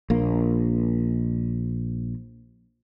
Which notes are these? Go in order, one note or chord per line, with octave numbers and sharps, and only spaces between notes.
A#1 A#3